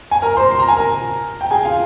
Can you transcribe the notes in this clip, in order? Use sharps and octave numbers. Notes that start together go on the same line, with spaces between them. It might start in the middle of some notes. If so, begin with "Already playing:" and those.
G#5
A#4 A#5
C5 C6
C6
A#5
G#5
A#4 A#5
G5
G#4 G#5
F4 F5